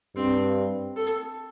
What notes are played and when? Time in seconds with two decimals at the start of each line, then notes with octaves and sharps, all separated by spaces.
0.15 G2 C4
0.97 A4